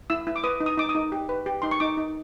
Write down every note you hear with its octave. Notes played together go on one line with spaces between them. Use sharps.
E4 E6
E4
D6
B4 D#6
D#4
D#6
D#4 D6
D#6
D#4
G4
B4
G4
D#4 C6
C#6
D#4 D6
D#4